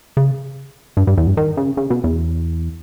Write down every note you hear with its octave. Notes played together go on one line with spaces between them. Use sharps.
C#3
G2
G2
E2
G2
D#3
C#3
C#3
B2
E2